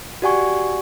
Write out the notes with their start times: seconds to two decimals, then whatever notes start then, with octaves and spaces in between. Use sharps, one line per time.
0.22 F#4 G4 D5 F#5 G#5 C#6